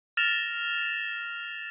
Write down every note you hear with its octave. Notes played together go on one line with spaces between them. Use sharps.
F6 A6 A#6 E7 F7